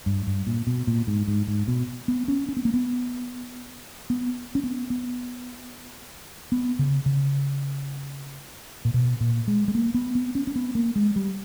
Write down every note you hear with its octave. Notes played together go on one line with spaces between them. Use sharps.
G2
G2
A#2
B2
A#2
G#2
G#2
G#2
B2
B3
C#4
C#4
B3
A#3
B3
B3
C#4
B3
B3
B3
C#3
C#3
A#2
B2
A#2
G#3
G#3
A#3
B3
B3
C#4
C#4
B3
A#3
G#3
G3